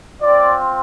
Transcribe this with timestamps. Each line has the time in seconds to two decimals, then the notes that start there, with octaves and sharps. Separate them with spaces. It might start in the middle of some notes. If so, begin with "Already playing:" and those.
0.22 C4 F4 D5